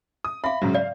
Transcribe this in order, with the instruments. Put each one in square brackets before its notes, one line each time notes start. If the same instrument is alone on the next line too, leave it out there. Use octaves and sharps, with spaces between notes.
[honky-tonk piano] D#6
[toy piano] E5 F5 [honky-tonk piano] B5
[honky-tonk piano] G#2 C#3 F#3
[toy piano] D5 [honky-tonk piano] F5